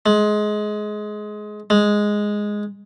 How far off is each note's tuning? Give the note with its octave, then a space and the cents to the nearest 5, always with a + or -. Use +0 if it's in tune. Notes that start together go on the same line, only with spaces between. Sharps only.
G#3 +20
G#3 +0